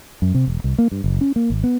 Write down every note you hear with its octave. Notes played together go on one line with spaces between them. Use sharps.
F#2
C3
E1
C2
A#3
G2
F#1
C#4
A#3
G#1
B3